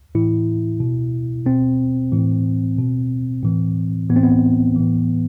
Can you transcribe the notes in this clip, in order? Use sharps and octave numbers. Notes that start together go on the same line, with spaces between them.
A2 E3 E4
B2
B2 C4
A2 E3
B2
A2 E3
A2 E3 B3
C4
B3
A2 E3